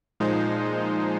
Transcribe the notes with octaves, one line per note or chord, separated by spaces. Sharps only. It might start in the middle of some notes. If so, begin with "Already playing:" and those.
A#2 F3 G#3 D#4 C5